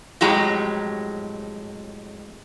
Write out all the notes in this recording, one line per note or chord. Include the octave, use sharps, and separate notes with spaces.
F2 A2 F#3 G#3 G4 A#5